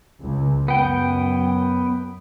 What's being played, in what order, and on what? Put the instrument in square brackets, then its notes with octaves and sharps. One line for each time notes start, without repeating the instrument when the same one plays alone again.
[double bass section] C#2
[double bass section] F#2 [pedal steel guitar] B3 G5